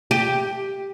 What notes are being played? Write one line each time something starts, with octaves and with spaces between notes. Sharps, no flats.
G4